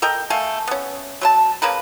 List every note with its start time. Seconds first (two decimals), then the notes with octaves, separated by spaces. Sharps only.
0.02 A4 A#4 D#5 G5
0.30 A3 F5 G#5
0.68 B3 C#4
1.21 F#3 C5 A5
1.62 C#3 A#3 A#4 B4